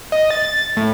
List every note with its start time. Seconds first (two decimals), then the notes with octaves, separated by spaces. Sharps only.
0.12 D#5
0.30 A6
0.77 A2